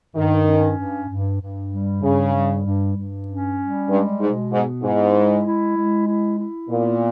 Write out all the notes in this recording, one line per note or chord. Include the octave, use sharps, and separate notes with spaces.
G2 D#3
C#4
G2
G2
G2
G3
G2 C#3
G3
G2
G2
C#4
G3
G2 G#3
G#2 B2
G#2 B3
G#2 E4
G#3
E4
G#3
E4
E4
A#2 B3